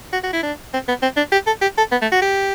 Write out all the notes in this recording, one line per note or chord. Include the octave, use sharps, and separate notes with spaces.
F#4
F#4
E4
D4
C4
B3
C4
D4
G4
A4
G4
A4
B3
A3
F#4
G4